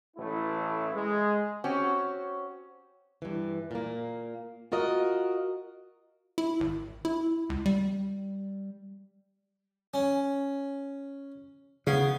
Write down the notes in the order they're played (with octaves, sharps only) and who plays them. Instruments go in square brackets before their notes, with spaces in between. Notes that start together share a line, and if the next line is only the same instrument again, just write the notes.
[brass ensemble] A1 A3 E4
G#3
[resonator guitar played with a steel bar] C4 C#4 F#4 G4
[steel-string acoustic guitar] G2 E3
A#2 A#3
F4 F#4 A#4 D#5
[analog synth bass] E4
G#1
E4
C#2
G3
[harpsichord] C#4
[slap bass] C#3 [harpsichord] B3